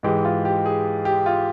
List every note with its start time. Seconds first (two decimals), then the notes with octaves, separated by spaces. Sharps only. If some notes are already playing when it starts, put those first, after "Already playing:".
0.03 G#2 E3 G#3 G4
0.25 F4
0.45 G4
0.66 G#4
1.05 G4
1.26 F4